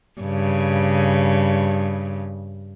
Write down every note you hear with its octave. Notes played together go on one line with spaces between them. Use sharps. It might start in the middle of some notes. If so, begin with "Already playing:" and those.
G2 C#3